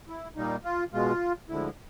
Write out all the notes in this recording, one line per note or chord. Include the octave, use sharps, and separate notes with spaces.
E4
A#2 G3 A#3 D#4
F4
B2 G#3 F4
D2 D3 F3 G#3 E4